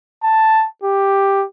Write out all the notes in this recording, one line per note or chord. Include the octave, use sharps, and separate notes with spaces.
A5
G4